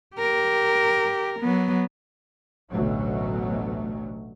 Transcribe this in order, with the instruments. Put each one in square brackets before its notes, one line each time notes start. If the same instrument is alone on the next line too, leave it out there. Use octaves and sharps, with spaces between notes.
[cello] G4 A#4
F#3 B3
[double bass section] A1 D2 B2 F#3 A3